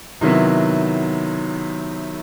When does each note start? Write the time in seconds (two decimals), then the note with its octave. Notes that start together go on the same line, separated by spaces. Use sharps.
0.21 C3 D#3 F#3 B3 E4